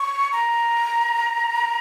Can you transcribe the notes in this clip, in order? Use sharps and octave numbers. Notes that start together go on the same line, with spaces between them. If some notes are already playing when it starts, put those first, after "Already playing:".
Already playing: C#6
A#5